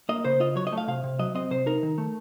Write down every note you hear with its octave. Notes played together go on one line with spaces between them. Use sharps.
A#3 D#5
C#3 C5
F4 D#5
F#3 C#5
D#5
A3
F5
C3 F5
C3
F#3 D#5
C4 D#5
C3 C5
D#4 A#4
D#3
A3